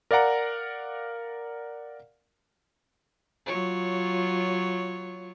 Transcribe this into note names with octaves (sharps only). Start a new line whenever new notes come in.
A#4 D5 F5 F#5 A#5
F#3 F4 C#5